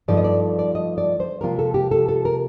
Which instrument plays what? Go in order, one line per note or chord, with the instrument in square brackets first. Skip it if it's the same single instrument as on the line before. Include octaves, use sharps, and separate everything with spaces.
[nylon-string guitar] G2 F3 A3 D#4 D5
D#5
D5
D5
D#5
D5
C5
C3 F3 A#3 F4 A#4
A4
G4
A4
A4
A#4